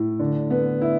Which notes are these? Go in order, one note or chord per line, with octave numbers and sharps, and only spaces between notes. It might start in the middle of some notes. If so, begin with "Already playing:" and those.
Already playing: A2
D3
B3
E4